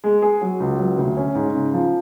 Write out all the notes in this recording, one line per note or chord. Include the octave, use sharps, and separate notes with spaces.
G#3
G#4
F#3
C#2
F#3
D2
C#4
G#2
C#3
F3